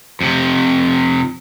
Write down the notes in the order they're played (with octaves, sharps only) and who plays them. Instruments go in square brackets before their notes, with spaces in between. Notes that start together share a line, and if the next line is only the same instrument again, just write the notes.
[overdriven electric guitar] F2 C3